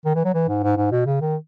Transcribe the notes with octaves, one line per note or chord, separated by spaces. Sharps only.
D#3
E3
F#3
E3
G#2
G#2
G#2
B2
C#3
D#3